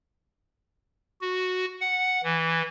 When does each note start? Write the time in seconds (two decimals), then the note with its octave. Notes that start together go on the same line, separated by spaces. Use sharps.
1.21 F#4
1.81 F#5
2.24 E3